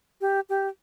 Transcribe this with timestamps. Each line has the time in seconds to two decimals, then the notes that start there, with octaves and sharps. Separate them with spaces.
0.21 G4
0.49 G4